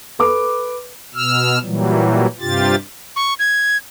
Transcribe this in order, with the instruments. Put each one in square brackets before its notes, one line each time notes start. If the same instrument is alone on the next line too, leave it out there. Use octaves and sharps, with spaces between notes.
[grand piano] A4 B4 D6
[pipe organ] B2 E6 F6
A#2 E3 F#3 G3
G2 C3 F4 G4 A6
[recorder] C#6
G#6